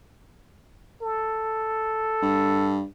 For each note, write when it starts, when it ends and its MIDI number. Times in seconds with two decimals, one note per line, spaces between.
1.02 2.80 69
2.22 2.84 43